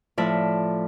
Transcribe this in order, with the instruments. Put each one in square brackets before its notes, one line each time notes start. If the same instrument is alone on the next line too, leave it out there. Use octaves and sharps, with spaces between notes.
[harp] A2 F3 D5 E5